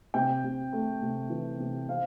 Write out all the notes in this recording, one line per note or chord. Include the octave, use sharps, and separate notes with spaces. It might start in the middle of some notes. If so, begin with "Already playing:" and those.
C3 G5
C3
A3
C3
E3
C3
C4 F5